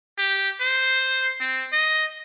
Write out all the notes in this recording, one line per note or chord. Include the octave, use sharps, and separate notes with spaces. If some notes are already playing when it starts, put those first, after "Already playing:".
G4
C5
C4
D#5